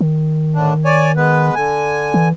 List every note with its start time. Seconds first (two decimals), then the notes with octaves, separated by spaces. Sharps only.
0.01 D#3
0.55 A2 D3 D4
0.85 C#5 D5 G#5
1.17 G#3 B3 B4
1.55 D3 G#5
2.14 E3